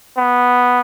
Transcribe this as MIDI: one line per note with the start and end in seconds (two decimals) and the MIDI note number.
0.17 0.80 59